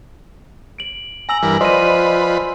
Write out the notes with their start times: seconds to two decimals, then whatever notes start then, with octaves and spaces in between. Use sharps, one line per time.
0.79 D7 F#7
1.29 G#5 A#5 E6 F#7
1.43 G2 E3 A#4
1.61 F3 B4 C5 D5 D#5 C6 D#7